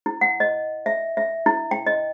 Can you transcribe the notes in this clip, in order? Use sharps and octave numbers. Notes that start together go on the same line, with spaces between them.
E4
F#5
D#5
E5
E5
E4
G5
D#5